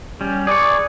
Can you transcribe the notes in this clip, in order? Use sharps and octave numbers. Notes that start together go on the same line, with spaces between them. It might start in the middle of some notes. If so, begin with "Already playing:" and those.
G3 C#4
G#4 B4 D5 C#6